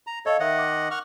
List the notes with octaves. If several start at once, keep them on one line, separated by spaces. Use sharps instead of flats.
A#5
A4 C#5 D#5 F5
D#3 D#5 E5 F#5
D6
F#5 C#6 F6